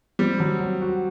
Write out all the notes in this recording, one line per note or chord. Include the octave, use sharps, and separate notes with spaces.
G3 C4
F#3
F#3
F#4